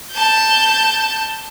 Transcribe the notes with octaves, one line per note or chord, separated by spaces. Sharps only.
A5 G6